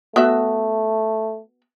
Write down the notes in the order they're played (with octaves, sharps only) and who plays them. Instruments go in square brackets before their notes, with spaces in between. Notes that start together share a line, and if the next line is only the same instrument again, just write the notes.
[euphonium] A3 [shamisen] B3 F#4 E5